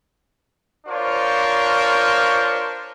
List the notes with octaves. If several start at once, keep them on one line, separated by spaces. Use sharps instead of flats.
D4 F4 A#4 C5 C#5